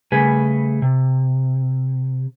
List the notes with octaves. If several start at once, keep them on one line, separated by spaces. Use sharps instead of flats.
C#3 G3 A3 G#4 B4 G#5
C3